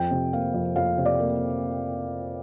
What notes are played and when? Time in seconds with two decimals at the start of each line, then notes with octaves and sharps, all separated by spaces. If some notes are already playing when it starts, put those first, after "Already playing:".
Already playing: F2 G5
0.11 C3
0.33 A#3 F5
0.54 F2
0.76 F2 F5
0.98 C3
1.06 D5
1.20 A#3